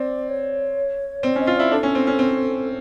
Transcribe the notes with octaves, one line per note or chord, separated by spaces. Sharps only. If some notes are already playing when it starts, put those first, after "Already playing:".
Already playing: C4 D5
C#5
C4 D5
C#4
D#5
F4
E4 D5
D4 A4
C#4
C4
C#4
C4